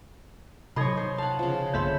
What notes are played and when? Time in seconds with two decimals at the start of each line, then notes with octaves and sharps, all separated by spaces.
0.76 C3 F#3 D#4 A4 C5 C#5 D#5 B5
0.97 C5
1.18 F5 F#5 A5
1.39 C#3 F3
1.74 B1 F#2 D3 B3 A4 C#5 E5 C6